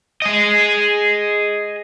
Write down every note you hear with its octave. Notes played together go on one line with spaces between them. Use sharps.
G#4 D#5